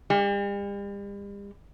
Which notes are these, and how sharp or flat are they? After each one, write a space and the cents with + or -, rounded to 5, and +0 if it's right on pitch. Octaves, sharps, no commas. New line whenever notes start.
G3 +40